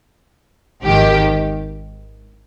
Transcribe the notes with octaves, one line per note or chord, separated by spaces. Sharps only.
G#1 G#2 D#3 G4